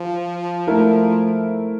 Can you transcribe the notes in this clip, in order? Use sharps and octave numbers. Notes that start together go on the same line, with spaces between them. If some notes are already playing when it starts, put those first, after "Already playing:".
Already playing: F3
A3 E4 A#4